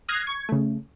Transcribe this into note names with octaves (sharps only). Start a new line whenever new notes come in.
D#6 F6 F#6 G#6 A#6 C7
C#6 G#6
C#3 A3